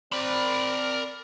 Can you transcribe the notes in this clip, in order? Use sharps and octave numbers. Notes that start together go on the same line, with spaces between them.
C4 A#4 D5 B5